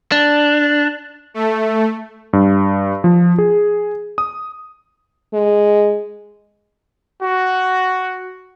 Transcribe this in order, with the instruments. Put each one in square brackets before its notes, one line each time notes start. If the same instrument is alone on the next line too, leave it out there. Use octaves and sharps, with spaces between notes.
[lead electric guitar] D4
[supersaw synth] A3
[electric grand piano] G2
F3
G#4
D#6
[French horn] G#3
[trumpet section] F#4